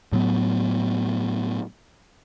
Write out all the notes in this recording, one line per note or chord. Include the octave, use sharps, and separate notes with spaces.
A2 F#3 B3